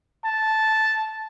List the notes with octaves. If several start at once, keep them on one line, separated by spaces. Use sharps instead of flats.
A5